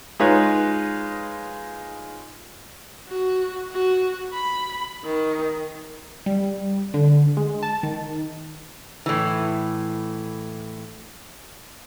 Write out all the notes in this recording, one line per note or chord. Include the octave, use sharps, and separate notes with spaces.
G#3 D#4 F4 B4 C#5
F#4
F#4
B5
D#3
G3
D3
G#3
A5
D#3
A2 E3